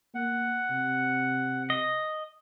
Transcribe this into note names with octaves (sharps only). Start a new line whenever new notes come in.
A#3 F#5
C3
D#5